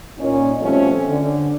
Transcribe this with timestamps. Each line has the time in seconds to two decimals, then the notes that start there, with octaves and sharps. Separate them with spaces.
0.18 A#2 C#4 D#4
0.60 B2 F3 G3 A3 C4 C#4
1.09 D3